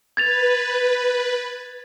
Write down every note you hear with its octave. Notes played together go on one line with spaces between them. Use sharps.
B4 G#6 A6 F7